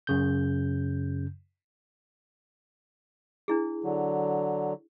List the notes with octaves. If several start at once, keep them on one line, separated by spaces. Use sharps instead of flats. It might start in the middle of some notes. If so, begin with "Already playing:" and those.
F#2 C#3 G6
D4 E4 G#4
D3 F#3